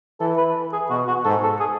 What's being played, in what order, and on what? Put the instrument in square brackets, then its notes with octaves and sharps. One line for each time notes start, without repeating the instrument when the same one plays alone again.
[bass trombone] E3 [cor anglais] A4
[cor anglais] B4
G#4
[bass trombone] B2 [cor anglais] F#4
[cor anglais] F#4
[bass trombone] G#2 [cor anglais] A4
[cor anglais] A4
G#4